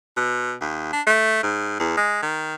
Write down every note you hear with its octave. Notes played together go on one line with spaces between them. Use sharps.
B2
D#2
D4
A3
G#2
E2
G#3
D#3